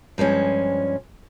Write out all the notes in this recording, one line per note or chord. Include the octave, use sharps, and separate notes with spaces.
G2 F3 G#3 C#4